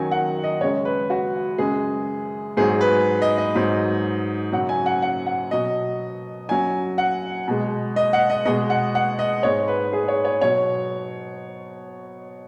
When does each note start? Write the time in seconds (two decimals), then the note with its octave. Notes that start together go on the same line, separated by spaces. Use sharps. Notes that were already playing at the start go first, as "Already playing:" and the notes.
Already playing: F#2 D#3 F#3 G#5
0.11 F#5
0.44 D#5
0.60 F#2 C#3 G#3 C#5
0.85 B4
1.10 F#4
1.58 F#2 C#3 G#3 G#4
2.57 G#2 G#4
2.61 F#3
2.81 B4
3.22 D#5
3.38 D#5
3.55 G#2 F#3
4.52 F#2 C#3 F#3 F#5
4.69 G#5
4.86 F#5
5.02 F#5
5.26 F#5
5.51 B2 F#3 D#5
6.49 F#2 F#3 G#5
6.98 F#5
7.48 B2 G#3
7.96 D#5
8.13 F#5
8.30 D#5
8.45 B2 G#3 D#5
8.70 F#5
8.95 F#5
9.19 D#5
9.43 G#2 G#3 C#5
9.68 B4
9.93 G#4
10.08 C#5
10.25 C#5
10.41 B2 F#3 C#5